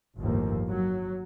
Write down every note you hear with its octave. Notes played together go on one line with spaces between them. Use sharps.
G1 D#2 A2 F3 A#3
F#3